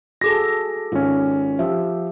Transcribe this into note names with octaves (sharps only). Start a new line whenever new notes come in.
F#4 G#4 A4 D6 A#6
G#1 C#4 F4
F3 G4 E5